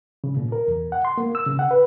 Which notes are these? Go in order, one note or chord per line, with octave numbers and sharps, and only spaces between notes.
C#3
A#2
A#4
E2
F#5
C6
A#3
E6
C#3
F#5
B4